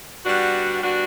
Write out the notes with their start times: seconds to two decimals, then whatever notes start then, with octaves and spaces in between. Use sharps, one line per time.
0.25 G3 B3 D4 F#4
0.82 G3 B3 D4 F#4